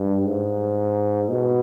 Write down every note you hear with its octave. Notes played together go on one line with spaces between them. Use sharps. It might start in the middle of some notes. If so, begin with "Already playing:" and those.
Already playing: G2
G#2
B2